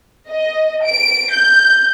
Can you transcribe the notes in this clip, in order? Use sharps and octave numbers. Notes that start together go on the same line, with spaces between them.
D#5
D7
G6